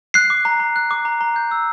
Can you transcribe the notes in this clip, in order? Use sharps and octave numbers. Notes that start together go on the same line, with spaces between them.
F#6 C7
D6
A#5
A#5
F#6
D6
A#5
A#5
G6
E6